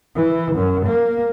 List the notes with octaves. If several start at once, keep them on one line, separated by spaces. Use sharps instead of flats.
E3
F#2
A#3